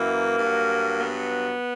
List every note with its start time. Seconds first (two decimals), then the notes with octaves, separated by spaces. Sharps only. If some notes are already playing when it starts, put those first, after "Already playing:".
Already playing: F#2 E3 A#3
0.39 G2 F#3
0.98 B3